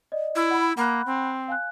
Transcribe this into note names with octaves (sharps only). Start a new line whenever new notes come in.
D5 D#5
E4
F#5 B5
A#3 F#5 B5 F#6
C4
F5 G#5 F#6